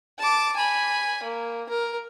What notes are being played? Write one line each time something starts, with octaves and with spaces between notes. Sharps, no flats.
A5 D6
G#5 B5
A#3
A#4